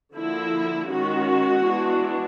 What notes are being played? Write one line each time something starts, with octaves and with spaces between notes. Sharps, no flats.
D3 F3 A#3 E4
D#3 G#3 C#4 F#4
E3 G#3 B3 D4